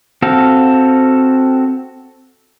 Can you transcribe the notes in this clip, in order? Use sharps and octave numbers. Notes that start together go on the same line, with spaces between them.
C4 F#4 A4 F5